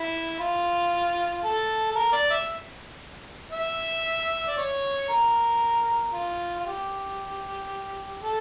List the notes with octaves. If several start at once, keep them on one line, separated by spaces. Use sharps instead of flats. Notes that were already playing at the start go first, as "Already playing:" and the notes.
Already playing: E4
F4
A4
A4
A#4
D5
E5
E5
D5
C#5
A#4
F4
F4
G4
A4